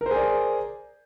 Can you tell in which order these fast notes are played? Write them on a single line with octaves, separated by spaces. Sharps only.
A#4 C5 G#4 D5